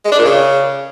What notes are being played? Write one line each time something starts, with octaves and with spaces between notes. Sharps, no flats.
G#3
D4
A#2
C#3